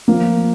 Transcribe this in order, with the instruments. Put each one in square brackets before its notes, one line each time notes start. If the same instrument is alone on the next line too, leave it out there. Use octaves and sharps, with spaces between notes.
[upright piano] F3 A#3